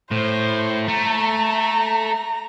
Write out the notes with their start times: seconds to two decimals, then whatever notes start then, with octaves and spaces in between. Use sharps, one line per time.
0.11 A2 C5
0.88 A3 A#5